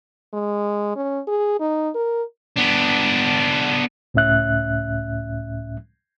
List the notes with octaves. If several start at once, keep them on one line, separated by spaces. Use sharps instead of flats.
G#3
C#4
G#4
D#4
A#4
B3 D4
C#2 A2 C#4 E5 F#6